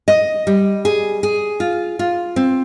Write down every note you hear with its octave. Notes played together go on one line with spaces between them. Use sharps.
D#5
G3
G#4
G#4
F4
F4
C4